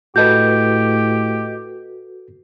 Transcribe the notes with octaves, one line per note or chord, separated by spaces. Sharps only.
A2 F#4 G4 A4 B4 D#5 G6